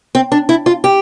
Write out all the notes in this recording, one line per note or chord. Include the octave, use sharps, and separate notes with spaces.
C4
D4
E4
F4
G4